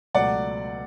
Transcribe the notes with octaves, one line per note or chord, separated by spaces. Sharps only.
C#2 B2 F#3 A3 D5 F#5